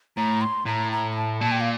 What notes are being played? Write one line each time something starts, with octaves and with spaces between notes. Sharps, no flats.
A2 A#5
C6
A2 A#5
A#5
A#5
A5
A#2 A5
G5
F5